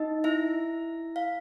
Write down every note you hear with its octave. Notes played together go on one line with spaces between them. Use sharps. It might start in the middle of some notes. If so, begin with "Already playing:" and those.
Already playing: D#4 D#5
E4 E5
F5